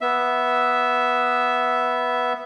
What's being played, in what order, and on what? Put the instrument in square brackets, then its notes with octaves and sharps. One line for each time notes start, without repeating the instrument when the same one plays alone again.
[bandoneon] B3 E5